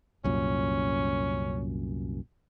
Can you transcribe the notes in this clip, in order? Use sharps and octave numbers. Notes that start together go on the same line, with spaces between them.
C2 F#2 A#2 C#4